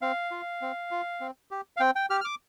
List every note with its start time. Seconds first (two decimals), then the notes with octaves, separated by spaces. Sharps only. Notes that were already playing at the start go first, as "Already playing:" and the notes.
0.02 C4 F5
0.31 F4
0.62 C4
0.91 F4
1.20 C4
1.51 G4
1.77 F5
1.80 C4 G5
1.96 G5
2.10 G4 F6
2.21 F6
2.25 D6